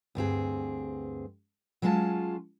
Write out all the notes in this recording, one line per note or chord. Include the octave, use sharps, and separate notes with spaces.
D2 G2 C4 G#4
F#3 G#3 C#4 F4 A5